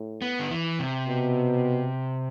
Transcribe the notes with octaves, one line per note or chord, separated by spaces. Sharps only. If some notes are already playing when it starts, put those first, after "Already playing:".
Already playing: A2
B3
D3
E3
C3
B2